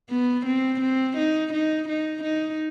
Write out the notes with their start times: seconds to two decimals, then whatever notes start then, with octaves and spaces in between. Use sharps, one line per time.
0.10 B3
0.46 C4
0.81 C4
1.17 D#4
1.53 D#4
1.89 D#4
2.24 D#4